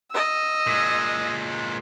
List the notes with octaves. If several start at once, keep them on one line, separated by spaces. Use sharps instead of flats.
D#5 E6
A#2 G#3